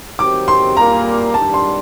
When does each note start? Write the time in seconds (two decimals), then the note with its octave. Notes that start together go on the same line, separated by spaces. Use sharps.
0.19 D#3 F#3 C4 G4 D6
0.48 C6
0.77 A#2 G3 A#3 A#5
1.34 G2 D#3 G3 D4 A5
1.54 C6